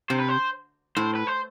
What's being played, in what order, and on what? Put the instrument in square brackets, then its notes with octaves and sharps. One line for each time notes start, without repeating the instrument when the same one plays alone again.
[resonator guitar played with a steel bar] C3 [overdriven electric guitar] C5
[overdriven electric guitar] B4
C5
[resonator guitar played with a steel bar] A2 [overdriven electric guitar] C5
[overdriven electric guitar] B4
C5